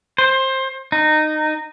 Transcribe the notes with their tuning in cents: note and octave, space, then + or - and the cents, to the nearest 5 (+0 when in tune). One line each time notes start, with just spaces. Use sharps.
C5 +20
D#4 -20